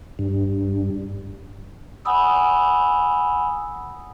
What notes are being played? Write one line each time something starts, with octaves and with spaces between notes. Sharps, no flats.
G2
F#5 G#5 B5 D#6 E6